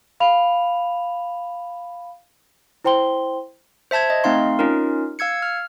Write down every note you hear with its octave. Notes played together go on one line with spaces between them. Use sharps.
F5 B5 F7
E4 C5 G5 C6 G7
C5 E5 A5 G6 G#6
D#5
A3 C4 D#4 F5 C6
C#4 D#4 F4 A#4
F5 E6 G#6 C#7
F6